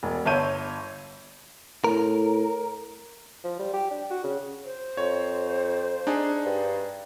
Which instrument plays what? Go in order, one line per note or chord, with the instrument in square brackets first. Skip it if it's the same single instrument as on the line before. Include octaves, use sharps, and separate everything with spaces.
[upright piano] E1
G1 C#5 E5 A5 G6 D#7
[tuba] A2 [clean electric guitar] A#4
[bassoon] F3
G3
G4
D4
F#4
C#3
[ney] C5
[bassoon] F2 [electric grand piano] C#5
[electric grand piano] D4 D#4 G#4
[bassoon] G2